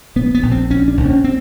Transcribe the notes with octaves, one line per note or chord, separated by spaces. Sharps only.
A#1 B3
B3
A#1
C4
A#1 C#4
D4
A#1
C#4
C4